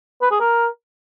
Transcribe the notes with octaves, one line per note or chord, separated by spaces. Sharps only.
B4
G#4
A#4